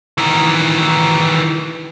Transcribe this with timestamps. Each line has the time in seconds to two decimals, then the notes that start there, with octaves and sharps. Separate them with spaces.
0.18 D#3 E3